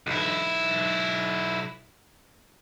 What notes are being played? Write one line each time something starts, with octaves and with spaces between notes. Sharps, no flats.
B1 E4